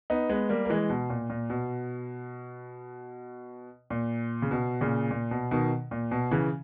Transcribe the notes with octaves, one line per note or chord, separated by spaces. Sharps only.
B3 D#4
G#3 B3
G3 A#3
A#3
E3 G#3
B2
A#2
A#2
B2
A#2
C#3
B2
A#2 C#3
A#2
B2
B2 D#3
A#2
B2
C#3 E3